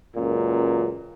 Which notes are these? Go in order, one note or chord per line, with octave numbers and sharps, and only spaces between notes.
C#2 F#2 A#2